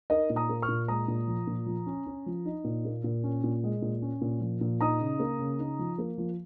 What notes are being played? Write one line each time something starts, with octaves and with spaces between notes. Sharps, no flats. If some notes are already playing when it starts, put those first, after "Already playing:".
D#4 A#4 D#5
A#2
A#5 D#6
A#3
C#6 F6
A#2
G#3 A#5 D#6
A#2
F3
A#2
F3
C#4
C#4
F3
D#4
A#2
A#3
A#2
C#4
A#2
G#3
A#2
C#4
A#2
F3
A#2
D#4 A#5 D#6
C#3
A#3
C#3
D#4
F3
A#3
F3